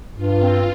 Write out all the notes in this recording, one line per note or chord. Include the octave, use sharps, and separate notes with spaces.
G2 F4
C4